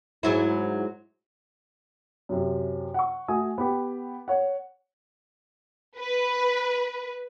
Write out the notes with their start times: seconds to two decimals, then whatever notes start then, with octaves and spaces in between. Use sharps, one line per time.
0.23 G#2 F#3 E4
2.29 F#2 C3
2.94 F#5 C#6
3.28 A3 F#4 G#5 D#6
3.58 B3 G4
4.28 C#5 F#5
5.97 B4